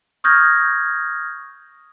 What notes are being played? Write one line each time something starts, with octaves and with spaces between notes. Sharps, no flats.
C#6 D#6 F6 G6 G#6 A#6